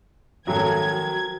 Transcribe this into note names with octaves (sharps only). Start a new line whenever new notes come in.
G#1 D#3 F3 F#3 F#4 A4 G#6